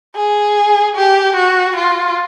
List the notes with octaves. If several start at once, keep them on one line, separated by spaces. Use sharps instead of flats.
G#4
G4
F#4
F4